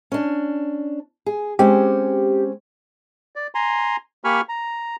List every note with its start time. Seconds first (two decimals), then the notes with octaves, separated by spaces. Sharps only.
0.12 C#4 D4
1.26 G#4
1.59 G#3 C4 C#4 G4
3.36 D5
3.55 G#5 A#5 C6
4.24 A#3 G4 G#5 B5 C#6 F6
4.49 A#5